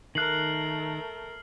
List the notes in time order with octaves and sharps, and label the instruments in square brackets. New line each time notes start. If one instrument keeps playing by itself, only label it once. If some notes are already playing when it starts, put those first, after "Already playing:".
[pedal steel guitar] D#3 F#6 [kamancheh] A3 A#4 [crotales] F6 C7 F#7